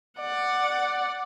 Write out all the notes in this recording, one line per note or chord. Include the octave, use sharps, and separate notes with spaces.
D5 F#5